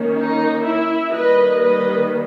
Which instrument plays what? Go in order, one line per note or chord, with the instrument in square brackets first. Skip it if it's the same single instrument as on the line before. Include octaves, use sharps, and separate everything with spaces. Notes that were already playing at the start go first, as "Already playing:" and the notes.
Already playing: [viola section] D#3 A#3 C#4
D#4
E4
D#3 G3 A#3 B4 D#5
B4 D#5